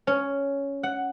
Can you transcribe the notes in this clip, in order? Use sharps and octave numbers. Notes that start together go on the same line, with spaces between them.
C#4
F#5